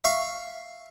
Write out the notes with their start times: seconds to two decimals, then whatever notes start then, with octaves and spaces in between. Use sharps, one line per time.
0.04 E5 F5 C#6